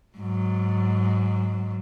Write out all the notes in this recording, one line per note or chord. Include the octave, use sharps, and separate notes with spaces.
G#2 F#3